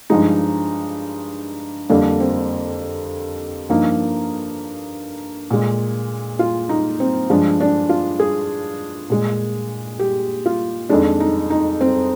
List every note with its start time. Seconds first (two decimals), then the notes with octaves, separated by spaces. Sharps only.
0.10 G2 F3 G#3 D#4
1.89 F2 D3 G3 A#3 D4
2.20 C4
3.69 G2 F3 A#3 D#4
5.50 A#2 G#3
6.39 F4
6.69 D#4
7.00 C4
7.30 G2 F3 G#3 D4
7.61 D4
7.89 F4
8.20 G#4
9.10 A#2 G#3
9.99 G4
10.46 F4
10.89 F2 D#3 G#3 D4
11.20 D#4
11.50 D#4
11.81 C4